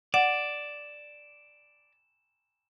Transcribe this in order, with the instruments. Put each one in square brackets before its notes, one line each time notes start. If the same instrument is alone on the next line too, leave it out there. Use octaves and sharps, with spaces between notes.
[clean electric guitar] D5 [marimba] F#5 [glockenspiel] E7